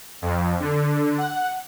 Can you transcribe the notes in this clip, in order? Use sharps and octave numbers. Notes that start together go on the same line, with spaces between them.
F2
D3
F#5